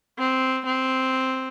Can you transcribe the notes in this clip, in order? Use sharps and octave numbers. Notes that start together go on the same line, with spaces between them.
C4
C4